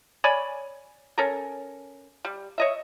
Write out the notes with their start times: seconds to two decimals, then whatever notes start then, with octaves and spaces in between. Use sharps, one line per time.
0.24 C#5 D5 G#5 B5
1.18 C#4 A4 A#4
2.25 G3
2.58 C#5 D#5 E5